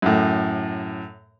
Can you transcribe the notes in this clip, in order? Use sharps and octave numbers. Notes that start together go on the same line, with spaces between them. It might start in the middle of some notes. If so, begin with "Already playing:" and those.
F#2 A2